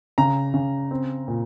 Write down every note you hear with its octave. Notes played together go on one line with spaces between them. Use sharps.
C#3 A#5
C#3
C4
A#2